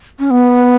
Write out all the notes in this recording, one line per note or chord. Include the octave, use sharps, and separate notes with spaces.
C#4
B3